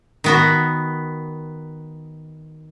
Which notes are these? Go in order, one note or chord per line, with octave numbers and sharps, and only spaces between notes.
D#3 B3 F#4